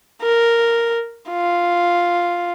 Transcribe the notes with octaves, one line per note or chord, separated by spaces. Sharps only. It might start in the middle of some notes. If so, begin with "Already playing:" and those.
A#4
F4